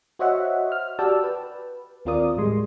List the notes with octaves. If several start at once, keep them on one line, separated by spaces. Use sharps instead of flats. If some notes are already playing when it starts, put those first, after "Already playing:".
F#4 C5 C#5 D#5 E5 F#5
F6
F#4 G4 D5 G5 A5 E6
B4
D#2 C4 F4 A#4 D5 D#6
A2 G3 G#3 C6